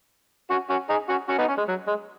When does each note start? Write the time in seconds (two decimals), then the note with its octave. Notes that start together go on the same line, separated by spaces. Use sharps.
0.50 C#4 F#4
0.69 C#4 F#4
0.89 D#4 G#4
1.09 C#4 F#4
1.29 C#4 F#4
1.38 B3 D#4
1.48 C#4
1.58 G#3
1.68 F#3
1.87 G#3